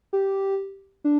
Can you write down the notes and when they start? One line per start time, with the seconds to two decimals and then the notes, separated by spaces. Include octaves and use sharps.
0.13 G4
1.04 D4